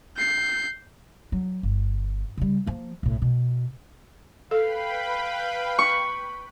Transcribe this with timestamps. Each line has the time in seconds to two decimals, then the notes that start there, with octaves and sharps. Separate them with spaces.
0.17 G6 C7
1.32 F#3
1.63 G1
2.37 C#3 G3
2.66 F3 A#3
3.03 B1 A2
3.22 B2
4.51 A4 B4 F5 G5 B5
5.79 C#6